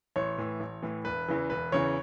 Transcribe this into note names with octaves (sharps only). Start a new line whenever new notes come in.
A1 C#5
A2 E3
A1
A2 E3
E1 B4
E2 C#3 E3
E1 B4
E2 C#3 E3 C#5